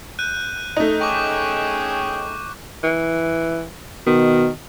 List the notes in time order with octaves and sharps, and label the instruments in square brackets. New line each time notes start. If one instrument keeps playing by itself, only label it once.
[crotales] F#6 G6 D#7
[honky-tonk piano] A3 D#4
[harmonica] C#4 G#4 G5 [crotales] C#6 D6
[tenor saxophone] E3
[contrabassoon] B2 [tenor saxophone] D#3